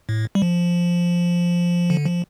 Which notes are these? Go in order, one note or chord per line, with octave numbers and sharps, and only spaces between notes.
A2
G3
F3
D3
F3